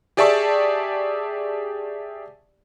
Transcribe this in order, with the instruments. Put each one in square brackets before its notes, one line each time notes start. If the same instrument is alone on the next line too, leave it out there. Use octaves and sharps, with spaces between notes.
[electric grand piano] G4 G#4 D5 E5 A5 C#6